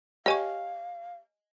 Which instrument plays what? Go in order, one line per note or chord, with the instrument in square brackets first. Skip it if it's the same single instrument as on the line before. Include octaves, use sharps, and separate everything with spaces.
[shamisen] G4 C#5 [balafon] D#5 G#5 C#6 [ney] F5